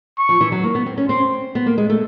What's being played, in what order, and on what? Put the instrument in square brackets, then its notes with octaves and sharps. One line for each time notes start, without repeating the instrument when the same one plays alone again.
[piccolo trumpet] C#6
[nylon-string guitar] F3
E3
F#3
A#3
B3
C4
C#4
[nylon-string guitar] C4 [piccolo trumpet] C6
[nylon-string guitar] B3
A#3
G#3
A3